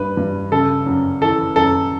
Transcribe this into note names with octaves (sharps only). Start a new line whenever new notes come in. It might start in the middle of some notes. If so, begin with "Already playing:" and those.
Already playing: G2 B4
G2
C#3 A4
F#2
E3 A4
F#2 A4